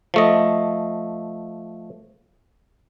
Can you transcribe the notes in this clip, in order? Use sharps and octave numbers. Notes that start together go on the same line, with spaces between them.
F3 A3 D#5